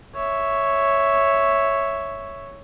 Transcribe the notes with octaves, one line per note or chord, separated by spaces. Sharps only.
C#5 E5